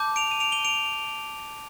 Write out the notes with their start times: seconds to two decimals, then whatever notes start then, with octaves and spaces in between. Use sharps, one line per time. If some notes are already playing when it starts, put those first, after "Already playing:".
Already playing: A5 D6 G6
0.16 D7 F7
0.31 D#7
0.40 D7 F7
0.52 D#7 G7
0.65 D7 F7